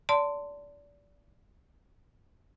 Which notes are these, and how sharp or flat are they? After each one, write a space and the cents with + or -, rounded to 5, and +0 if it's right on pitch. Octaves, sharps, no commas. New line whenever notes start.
D5 -25 A5 +20 C6 -10